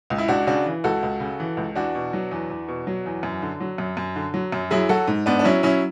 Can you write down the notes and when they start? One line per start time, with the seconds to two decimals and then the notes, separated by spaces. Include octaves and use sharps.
0.10 C#2
0.18 E4
0.28 C#2 D4 F#4
0.47 C#3 D4 F#4
0.66 E3
0.84 C#2 F#4 A4
1.03 C#2
1.20 C#3
1.40 E3
1.57 C#2
1.75 E2 D4 F#4
1.95 B2
2.13 F#3
2.31 E2
2.50 E2
2.68 B2
2.87 F#3
3.06 E2
3.23 F#2
3.42 D3
3.60 F#3
3.78 F#2
3.97 F#2
4.16 D3
4.34 F#3
4.52 F#2
4.71 F#3 E4 G#4
4.89 F#3 F#4 A4
5.07 G#2
5.26 G#2 B3 D4
5.39 D4
5.44 F#3 C#4 E4
5.63 F#3 C#4 E4